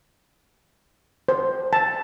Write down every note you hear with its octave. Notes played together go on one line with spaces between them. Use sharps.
C5
A5